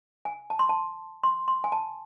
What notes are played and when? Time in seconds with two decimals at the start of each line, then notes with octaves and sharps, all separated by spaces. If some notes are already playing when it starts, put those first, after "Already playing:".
0.25 G#5
0.50 A5
0.59 C6
0.69 A5
1.23 C6
1.48 C6
1.64 G#5
1.72 A5